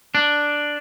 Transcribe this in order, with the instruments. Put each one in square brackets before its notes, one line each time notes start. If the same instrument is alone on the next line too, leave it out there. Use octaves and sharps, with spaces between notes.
[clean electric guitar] D4